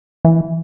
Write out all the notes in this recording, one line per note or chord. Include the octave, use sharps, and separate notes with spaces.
E3